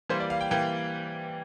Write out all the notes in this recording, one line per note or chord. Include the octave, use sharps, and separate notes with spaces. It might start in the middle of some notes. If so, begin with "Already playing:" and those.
E3 G3 A#3 C5
D5
F5
G5
E3 G3 A#3 G5